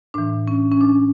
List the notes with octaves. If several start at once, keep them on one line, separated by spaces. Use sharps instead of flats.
A2 E3 D4
C#4
C#4
D4